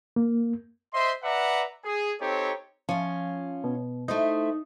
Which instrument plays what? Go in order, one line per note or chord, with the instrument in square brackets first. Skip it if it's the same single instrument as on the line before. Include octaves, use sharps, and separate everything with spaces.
[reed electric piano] A#3
[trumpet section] C5 D#5 E5 C6
B4 D5 E5 F#5 A#5
G#4
C4 D#4 G4 A4 C#5
[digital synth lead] F3 [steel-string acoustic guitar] C#4 F4
[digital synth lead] B2
[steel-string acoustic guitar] A3 E4 C5 [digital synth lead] D#4